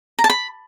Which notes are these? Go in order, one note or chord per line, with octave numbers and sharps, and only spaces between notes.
A#5
A5
B5